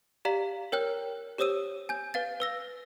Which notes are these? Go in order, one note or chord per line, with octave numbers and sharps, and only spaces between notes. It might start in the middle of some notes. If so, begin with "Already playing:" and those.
G4 D5 F5 A#5 B6 F#7
A#4 C#5 G5 F6 F#6
G4 C5 C#5 D#6 E6 D#7
G#5 G6
B4 F5 A6
B4 E6 A#6